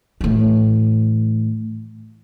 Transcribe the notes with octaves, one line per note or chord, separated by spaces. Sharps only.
A2 E3